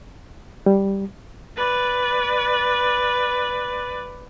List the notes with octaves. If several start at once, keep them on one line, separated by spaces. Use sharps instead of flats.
G3
B4 D5